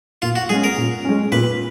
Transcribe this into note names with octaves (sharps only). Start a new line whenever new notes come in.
A#2 F4
F#4
G#3 C#4 G#4
A#4
A#2
G#3 C#4
A#2 B4